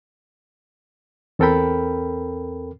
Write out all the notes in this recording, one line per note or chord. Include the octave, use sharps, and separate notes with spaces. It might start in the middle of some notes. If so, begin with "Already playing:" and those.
E2 C4 A4 A#4 G5 B5